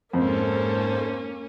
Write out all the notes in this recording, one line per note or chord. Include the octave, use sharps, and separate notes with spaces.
F2 G#2 A#3 C#4 A4 C5